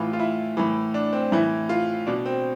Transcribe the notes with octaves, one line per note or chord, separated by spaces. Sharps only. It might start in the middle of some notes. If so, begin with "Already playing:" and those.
Already playing: A2 E3 F4
F4
E4
A2 E3
D4
C4
A2 E3 E4
F4
B2 D4
C4